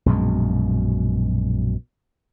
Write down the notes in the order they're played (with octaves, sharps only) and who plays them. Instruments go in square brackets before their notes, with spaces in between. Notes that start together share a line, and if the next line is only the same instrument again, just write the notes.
[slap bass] A#1 F#2 B2 G#3